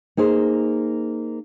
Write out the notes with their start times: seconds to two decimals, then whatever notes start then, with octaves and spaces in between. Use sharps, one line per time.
0.17 A#3 D#4 G#4 C5